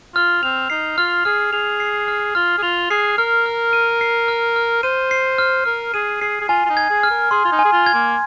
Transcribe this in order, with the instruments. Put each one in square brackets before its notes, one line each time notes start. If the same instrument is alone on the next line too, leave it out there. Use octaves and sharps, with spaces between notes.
[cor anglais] F4 [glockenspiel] F6
[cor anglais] C4 [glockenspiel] F7
[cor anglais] D#4 [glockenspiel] C7
[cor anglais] F4 [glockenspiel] F6
[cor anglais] G#4 [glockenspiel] F6
[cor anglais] G#4 [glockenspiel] F7
[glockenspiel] C7
F6
[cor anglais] F4 [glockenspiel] F6
[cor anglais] G#4
[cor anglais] F4 [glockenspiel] F7
[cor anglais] G#4 [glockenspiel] C7
[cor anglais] A#4 [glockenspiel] F6
[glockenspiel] F6
D#7
C7
F6
F6
[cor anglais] C5 [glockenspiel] D#7
[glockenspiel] C7
F6
[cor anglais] A#4 [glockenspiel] F6
[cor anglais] G#4 [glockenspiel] D#7
[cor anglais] G#4 [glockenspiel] C7
[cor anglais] G#4
[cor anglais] F4 [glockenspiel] G#5
[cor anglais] F4
D#4
[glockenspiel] G#6
[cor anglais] G#4
[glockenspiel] F6
[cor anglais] A#4
[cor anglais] G#4 [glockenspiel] C6
[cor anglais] F4
D#4
[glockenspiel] G#5
[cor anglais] G#4
F4
[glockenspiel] G#6
[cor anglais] A#3